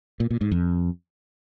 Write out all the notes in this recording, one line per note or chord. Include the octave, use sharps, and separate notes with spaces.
A#2
A#2
G#2
F2